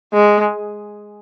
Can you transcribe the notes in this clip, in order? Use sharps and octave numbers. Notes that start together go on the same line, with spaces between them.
G#3